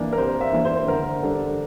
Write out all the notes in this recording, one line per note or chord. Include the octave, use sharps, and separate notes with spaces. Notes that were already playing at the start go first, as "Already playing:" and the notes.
Already playing: E3 A#3 D4
A#4
C3 C5
E5
E3 A#3 D4
C5
D3 A#4
G3 D4 A4